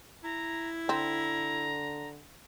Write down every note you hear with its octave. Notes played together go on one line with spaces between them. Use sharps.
E4 A#5
D3 C4 A#5